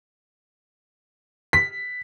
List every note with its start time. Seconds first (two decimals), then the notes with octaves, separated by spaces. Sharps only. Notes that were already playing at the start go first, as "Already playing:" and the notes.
1.53 B6